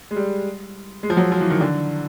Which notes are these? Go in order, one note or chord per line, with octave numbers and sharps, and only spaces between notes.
G#3
G3
G#3
F3
F#3
F3
E3
D#3
D3